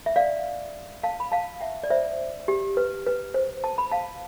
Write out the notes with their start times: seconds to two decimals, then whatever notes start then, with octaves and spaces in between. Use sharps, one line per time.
0.06 E5
0.16 D5 F5
1.03 F5 A5
1.20 B5
1.32 F5 A5
1.61 E5 G5
1.83 D5
1.90 C5 E5
2.48 G4
2.77 B4
3.06 B4
3.34 C5
3.64 A5
3.78 B5
3.91 F5 A5